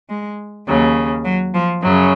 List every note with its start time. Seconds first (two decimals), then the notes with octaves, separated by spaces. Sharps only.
0.10 G#3
0.67 D#2 C#3 F#3
1.25 F#3
1.54 F3
1.83 F#2 C#3 F#3